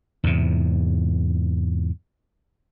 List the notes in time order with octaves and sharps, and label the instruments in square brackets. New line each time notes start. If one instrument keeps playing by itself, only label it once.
[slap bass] E2 G#2 C3